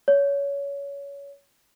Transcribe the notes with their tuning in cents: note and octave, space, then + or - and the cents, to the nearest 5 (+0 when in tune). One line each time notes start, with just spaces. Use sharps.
C#5 +20